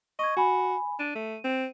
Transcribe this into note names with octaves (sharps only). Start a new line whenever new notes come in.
D#5 C#6 G#6
F#4 G#5 B5
D4 D#7
A3
C4